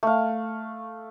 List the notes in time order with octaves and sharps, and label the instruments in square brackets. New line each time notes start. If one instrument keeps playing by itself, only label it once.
[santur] A3 F5